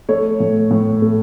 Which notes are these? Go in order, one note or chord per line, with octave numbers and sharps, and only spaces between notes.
A3 C#5
A2
A2
A3